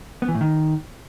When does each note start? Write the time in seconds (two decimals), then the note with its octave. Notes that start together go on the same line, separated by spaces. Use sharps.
0.22 B3
0.28 E3
0.35 A2
0.41 D#3